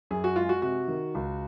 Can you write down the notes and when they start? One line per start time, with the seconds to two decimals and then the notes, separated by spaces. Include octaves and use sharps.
0.11 F#2 G#4
0.24 F#4
0.36 G#3 F4
0.49 F#4
0.62 C3 F#4
0.88 D#3
1.15 C#2